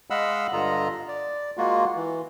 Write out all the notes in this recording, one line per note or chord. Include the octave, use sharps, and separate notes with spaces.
G#3 D#5 F5 F#5 B5 E6
G2 D3 F4 D#5 A#5
D5
G#3 A#3 F4 F#4
E3